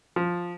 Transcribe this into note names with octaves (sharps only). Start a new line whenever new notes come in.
F3